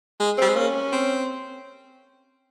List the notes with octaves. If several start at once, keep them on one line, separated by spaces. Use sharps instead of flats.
G#3
G3 C4
G#3
A#3 C#4
C4